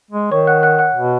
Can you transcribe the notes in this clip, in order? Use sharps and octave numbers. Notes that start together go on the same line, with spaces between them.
G#3
D#3 C#5 C#6
F#5 F#6
F#5 F#6
F#5 F#6
B2